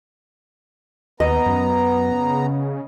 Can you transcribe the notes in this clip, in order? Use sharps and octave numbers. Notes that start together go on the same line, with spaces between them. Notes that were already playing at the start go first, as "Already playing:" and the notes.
D#2 B3 D#5 A#5
F#2
C#3